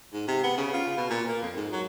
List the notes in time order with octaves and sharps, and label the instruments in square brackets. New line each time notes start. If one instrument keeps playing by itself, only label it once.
[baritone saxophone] G#2
C3
B3
C#3
F4
B2
A#2
A#3
F2
G#2
F#3